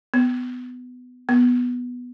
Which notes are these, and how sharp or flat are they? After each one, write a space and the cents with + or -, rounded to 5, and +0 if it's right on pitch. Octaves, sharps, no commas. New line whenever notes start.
B3 +15
B3 -5